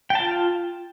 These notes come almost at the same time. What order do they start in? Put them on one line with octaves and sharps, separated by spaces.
G5 A5 F4